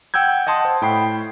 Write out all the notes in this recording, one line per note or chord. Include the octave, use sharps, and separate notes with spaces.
F#5 G5 E6 G6 G#6
D#5 F#5 A5 C6 D#6
C5
A2 G5 B5 C7